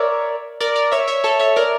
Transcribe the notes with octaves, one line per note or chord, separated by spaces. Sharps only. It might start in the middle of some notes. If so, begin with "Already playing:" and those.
Already playing: A#4 C#5 D5 E5
A#4 D5
A#4 D5
C#5 E5
C#5 E5
A4 C#5
C#5 E5
A#4 D5